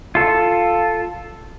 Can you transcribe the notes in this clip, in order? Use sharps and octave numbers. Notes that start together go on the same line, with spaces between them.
F4 A4